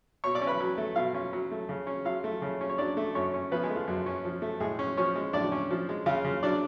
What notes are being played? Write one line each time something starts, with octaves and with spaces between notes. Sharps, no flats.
B2 C#5 C#6
D5 D6
C#4
B4 B5
F#3
A3
B2 F4 F5
C#4
F#3
A3
C#3
C#4
F#3 F4 F5
A3
C#3
C#4
C#5
F#3 D4 D5
A3
F#2 C#4 C#5
C#4
F3 B3 B4
G#3 G#4
A3
F4
F#2
C#4
F3
A3
A2 G#3 G#4
C#4
F3 C#4 C#5
G#3
A2 D4 D5
C#4
F3
G#3
C#3 F4 F5
C#3
F#3 D4 D5